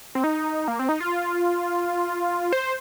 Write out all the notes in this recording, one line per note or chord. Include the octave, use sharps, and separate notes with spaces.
C4
D#4
A#3
C4
D#4
F4
C5